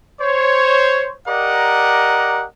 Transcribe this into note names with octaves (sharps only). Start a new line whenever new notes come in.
C5 C#5
G4 A#4 D5 D#5 F#5 A#5